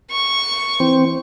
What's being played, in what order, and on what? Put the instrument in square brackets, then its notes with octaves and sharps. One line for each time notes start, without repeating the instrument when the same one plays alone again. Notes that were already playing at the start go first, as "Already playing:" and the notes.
[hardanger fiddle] C#6
[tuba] E3 [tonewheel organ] C4